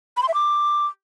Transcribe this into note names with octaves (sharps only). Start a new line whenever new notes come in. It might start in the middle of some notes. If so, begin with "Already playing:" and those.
B5
C6
E5
D6